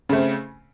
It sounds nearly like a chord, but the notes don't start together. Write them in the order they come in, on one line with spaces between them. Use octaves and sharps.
C#3 A3 C4